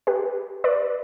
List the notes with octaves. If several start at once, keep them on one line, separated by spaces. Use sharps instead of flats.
G4 B4
B4 D5